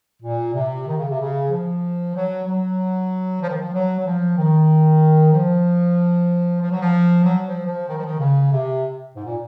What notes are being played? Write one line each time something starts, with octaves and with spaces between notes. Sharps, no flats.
A#2
C3
D#3
C#3
C3
C#3
F3
F#3
F#3
F3
D#3
F3
F#3
F#3
F3
D#3
F3
F3
F#3
F3
F#3
F#3
F3
F3
D#3
F3
D#3
C#3
C3
G#2
A#2